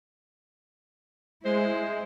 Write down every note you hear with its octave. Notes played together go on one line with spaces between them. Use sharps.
G#3 E4 C5